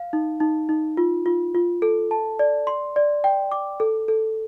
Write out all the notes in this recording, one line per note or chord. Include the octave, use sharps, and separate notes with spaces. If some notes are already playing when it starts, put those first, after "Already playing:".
Already playing: F5
D#4
D#4
D#4
F4
F4
F4
A4
A5
D5
C6
D5
G5
D6
A4
A4